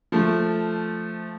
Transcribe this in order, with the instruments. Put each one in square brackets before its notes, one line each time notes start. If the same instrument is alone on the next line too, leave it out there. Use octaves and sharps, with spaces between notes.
[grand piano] F3 A3